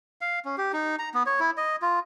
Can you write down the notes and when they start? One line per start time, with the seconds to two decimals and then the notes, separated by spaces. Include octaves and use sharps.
0.21 F5
0.45 C#4
0.58 G4
0.73 D#4
0.99 A#5
1.14 B3
1.26 C#5
1.40 E4
1.57 D#5
1.82 F4